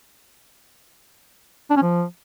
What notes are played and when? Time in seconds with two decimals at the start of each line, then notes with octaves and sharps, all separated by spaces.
1.70 D4
1.76 C#4
1.82 F3